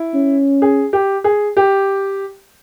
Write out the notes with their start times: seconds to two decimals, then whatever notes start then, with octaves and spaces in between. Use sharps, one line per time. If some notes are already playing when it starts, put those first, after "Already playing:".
Already playing: E4
0.14 C#4
0.62 G#4
0.93 G4
1.24 G#4
1.57 G4